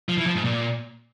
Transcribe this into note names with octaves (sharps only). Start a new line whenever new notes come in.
F3
E3
F3
G#2
A#2